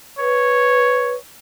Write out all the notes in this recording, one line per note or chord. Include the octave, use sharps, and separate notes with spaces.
B4 C#5